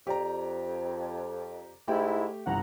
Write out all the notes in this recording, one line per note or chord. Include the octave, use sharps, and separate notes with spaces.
F2 G4 D5 A#5
G#2 A3 E4 G4 G5
G1 C2 G2 F#5 A#5